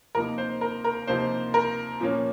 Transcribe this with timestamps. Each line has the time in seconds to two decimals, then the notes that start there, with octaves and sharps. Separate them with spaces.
0.15 C3 F3 A#3 D#4 A#4
0.38 C5
0.61 A#4
0.84 A#4
1.07 C3 F3 A#3 D#4 C5
1.54 A#4
2.00 A#2 F3 A#3 C#4